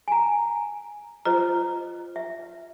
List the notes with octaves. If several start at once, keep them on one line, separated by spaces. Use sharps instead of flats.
G#5 A#5
F4 C5 D#5 A#5
E5